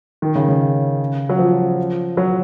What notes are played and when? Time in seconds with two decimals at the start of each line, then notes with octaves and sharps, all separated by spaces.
0.22 D#3
0.35 C#3
0.48 C#3
1.29 F#3
1.39 F3
2.17 F#3